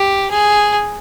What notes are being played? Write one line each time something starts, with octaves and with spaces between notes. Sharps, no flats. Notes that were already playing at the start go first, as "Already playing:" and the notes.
Already playing: G4
G#4